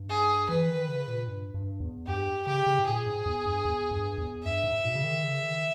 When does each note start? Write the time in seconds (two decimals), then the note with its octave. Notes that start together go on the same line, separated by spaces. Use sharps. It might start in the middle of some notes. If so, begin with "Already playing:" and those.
Already playing: G2
0.09 G#4
0.49 E3 B4
0.69 D#3
0.88 C#3
1.08 A#2
1.28 G2
1.54 G2
1.80 E2
2.07 G2 G4
2.47 C#3 G4
2.67 C#3
2.79 G#2
2.86 A#2 G#4
3.06 G#2
3.26 E2
3.45 G2
3.65 E2
3.91 G2
4.18 E2
4.44 G2 E5
4.64 G#2
4.85 B2
4.95 C#3
5.04 D#3
5.24 C#3
5.43 D#3